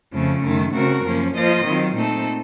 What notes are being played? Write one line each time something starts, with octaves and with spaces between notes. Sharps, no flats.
F2 C#3 F3 A3
F#2 D#3 A3
C#3 A3 C4 F#4 A#4
F#2 F3 A#3 C#4
F3 A#3 F4 C5 D#5
D#3 F#3 C4 F4
A#2 A3 C4 D#4 A4